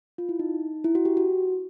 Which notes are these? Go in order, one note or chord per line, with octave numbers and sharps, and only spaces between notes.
F4
E4
D#4
E4
F#4
G4
F#4